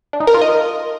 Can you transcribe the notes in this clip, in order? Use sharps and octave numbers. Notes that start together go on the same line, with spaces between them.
D4
D#4
A#4
F4
D#5